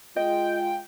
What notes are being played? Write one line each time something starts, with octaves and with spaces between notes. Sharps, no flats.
G#3 F4 D#5 G5